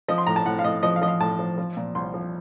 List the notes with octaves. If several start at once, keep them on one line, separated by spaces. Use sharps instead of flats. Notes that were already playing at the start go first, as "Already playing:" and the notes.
F3 D#5
C6
A2 A#5
A5
A2 F#5
F5
A2 D#5
F3 D#5
F5
F3 D#5
F5
A2 A5
F3
F3
A#2
C2 C6
F3